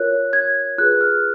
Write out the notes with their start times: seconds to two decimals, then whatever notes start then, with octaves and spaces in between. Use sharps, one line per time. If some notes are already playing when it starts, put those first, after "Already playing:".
Already playing: F4 A#4 C#5 F#6
0.33 G#6
0.78 F4 G#4 B4 F#6
1.01 F6